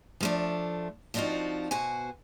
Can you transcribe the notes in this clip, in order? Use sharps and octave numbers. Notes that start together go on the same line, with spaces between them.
F3 A3 D4
F3 C4 D4 D#4 F4 F#4
B2 F#4 C5 G#5